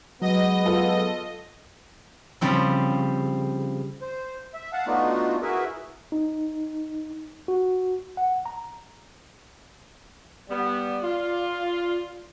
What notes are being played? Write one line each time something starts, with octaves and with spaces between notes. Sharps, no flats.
F#3 G#3 B3 D#5
F4 A4 F5
C#3 F3 G3 C4 E4
C5
E5
F5 F#5 A5
A3 B3 D4 D#4 F4 F#4
E4 F#4 G#4 A#4 B4 E5
D#4
F#4
F#5
A#5
G3 B3 D5
F4